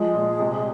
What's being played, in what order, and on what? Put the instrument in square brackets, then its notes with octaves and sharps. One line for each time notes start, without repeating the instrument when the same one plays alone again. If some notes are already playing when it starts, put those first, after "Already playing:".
Already playing: [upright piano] F3 [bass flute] G#3
[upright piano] A#2
C3